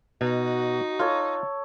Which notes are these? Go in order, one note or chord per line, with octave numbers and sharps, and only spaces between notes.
B2 D#4 F#4
F4 A4 C#5